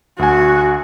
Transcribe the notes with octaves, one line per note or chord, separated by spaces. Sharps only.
D2 F#4 G#5